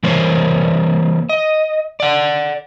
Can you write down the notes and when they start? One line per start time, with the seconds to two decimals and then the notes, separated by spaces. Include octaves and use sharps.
0.03 E3 G3 A#3 C5 C#5
1.29 D#5
2.00 D5 F#5